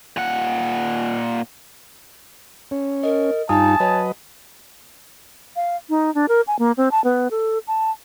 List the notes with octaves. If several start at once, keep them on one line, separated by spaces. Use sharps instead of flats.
A#2 F#5
C#4
A#4 D#5
G2 D#4 F4 G#5 A5 D#6
F#3 B4 C#5 D#5
F5
D#4
D4
A#4
G#5
A#3
C4
A5
B3
A4
A5